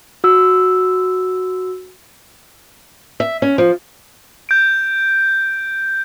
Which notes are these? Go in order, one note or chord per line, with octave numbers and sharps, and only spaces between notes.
F#4 E6
E5
C#4
F3
G6 D7